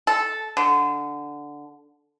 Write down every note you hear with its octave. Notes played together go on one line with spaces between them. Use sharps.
A4
D3